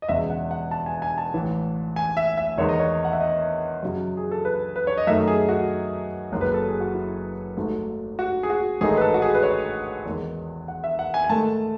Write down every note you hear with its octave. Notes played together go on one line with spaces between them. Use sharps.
D#5
E1 E2 C#3 E5
F#5
F#5
A5
G#5
G#5
A5
A1 A2 E3
G#5
E5
E5
E2 D#3 G#3 B3 D#4 C#5
D#5
C#5
F#5
E5
D#5
F#2 C#3 F#3
G#4
A4
B4
B4
C#5
D#5
F#2 D#3 A3 D#4 E5
G#4
F#4
F#1 F#2 D#3 G#3
B4
A4
G#4
F#4
E4
G#1 G#2 F#3 A3
F#4
G#4
F#4
A1 G#2 D#3 A3 D#4 G#4
B4
A4
F#4
G#4
B4
C#5
E2 D#3 G#3
F#5
E5
F#5
G#5
G#5
G#2 D#3 A3 A5